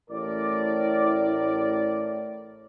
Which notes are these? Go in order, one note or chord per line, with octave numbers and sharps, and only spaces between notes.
A1 A2 E4 A#4 D5